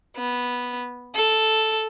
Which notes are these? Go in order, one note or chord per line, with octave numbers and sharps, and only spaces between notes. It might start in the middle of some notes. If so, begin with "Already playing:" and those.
B3
A4